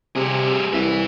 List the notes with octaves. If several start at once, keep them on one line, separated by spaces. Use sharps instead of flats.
C3 G3 G#4
C2 B4 E5